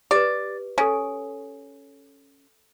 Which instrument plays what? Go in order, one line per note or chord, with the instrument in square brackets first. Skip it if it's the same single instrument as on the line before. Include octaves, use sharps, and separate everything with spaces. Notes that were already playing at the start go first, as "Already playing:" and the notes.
[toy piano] G4 B4 [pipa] D5
[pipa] C#4 [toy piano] A4 G#5